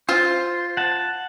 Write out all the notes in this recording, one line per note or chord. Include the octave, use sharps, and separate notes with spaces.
F4 C5
F#5 A5